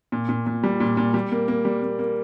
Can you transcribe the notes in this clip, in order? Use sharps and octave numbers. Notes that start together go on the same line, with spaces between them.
A#2
A#2
A#2
G3
A#2
A#2
G3
A#3
A#3
G3
A#3
A#3